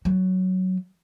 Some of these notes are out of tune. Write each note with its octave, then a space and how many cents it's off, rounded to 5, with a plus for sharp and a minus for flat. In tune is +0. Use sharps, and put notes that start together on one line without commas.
F#3 +5